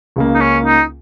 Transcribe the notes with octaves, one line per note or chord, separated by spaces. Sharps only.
C#2 C#3 A#3
D#4
C#4
D#4